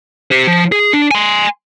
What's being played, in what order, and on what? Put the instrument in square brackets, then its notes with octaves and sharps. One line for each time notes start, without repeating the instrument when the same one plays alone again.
[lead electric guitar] G4 C5
F3
G#4
D4
G#5 C6